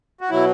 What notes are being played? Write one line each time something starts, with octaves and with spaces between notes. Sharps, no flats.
F#4
B2 F#3 E4